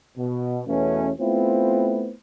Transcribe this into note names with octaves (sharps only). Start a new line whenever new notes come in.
B2
E2 B2 A3 B3 C#4
A3 B3 C4 E4 F4 C5